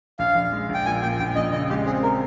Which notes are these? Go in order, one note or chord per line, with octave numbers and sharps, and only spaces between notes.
A#1 F5
A#1
G#3
A#1
G5
A#2 G#5
A#2 G5
A#1 G5
A#1 D#5
C#3 D#5
G#3 G4
C4 G#4
A#4